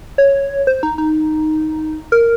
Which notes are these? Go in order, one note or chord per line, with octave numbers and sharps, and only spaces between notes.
C#5
C5
D#4
D#4
A#4